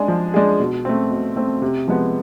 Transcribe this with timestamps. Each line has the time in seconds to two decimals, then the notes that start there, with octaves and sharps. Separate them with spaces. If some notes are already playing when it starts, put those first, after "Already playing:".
Already playing: G#3 D4 G#4
0.08 F3
0.34 G#3 D4 G#4
0.60 B2
0.85 A3 C4
1.11 B2
1.36 A3 C4
1.62 C3
1.88 F3 G#3 B3